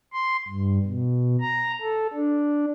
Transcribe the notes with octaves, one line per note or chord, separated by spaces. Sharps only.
C6
G2
B2
A#5
A4
D4